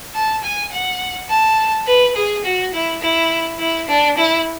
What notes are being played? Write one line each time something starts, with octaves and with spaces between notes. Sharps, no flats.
A5
G#5
F#5
A5
B4
G#4
F#4
E4
E4
E4
D4
E4